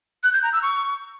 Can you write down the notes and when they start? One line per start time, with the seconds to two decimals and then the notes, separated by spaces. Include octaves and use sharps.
0.24 F#6
0.33 G6
0.43 A#5
0.53 E6
0.62 C#6